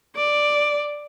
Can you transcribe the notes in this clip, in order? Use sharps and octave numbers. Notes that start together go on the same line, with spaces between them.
D5